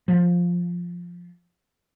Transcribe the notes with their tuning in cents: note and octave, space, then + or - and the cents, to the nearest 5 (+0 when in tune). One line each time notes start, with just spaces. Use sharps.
F3 +5